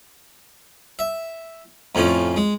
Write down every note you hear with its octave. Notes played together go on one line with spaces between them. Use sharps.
E5
F2 A2 F3 C#4
G#3